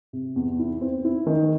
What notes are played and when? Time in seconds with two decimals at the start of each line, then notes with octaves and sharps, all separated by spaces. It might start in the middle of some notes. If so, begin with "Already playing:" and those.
0.13 C3
0.36 E2
0.59 E4
0.81 C4
1.04 E4
1.26 D#3